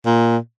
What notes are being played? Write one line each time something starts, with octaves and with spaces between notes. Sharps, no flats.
A#2